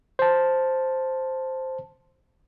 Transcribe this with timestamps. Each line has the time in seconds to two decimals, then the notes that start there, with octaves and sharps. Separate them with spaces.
0.19 C5 A5